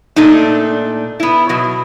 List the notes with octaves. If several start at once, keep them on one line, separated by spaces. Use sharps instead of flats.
A#2 A3 D4 D#4
B3 E4
B2 F#3